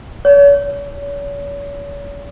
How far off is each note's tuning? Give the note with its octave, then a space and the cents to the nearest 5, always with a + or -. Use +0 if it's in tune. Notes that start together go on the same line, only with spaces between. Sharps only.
C#5 +40